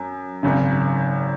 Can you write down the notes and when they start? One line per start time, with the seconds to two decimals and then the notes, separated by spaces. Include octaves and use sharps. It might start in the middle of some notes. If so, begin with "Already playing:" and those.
Already playing: F#2
0.43 G#1 F#2 C#3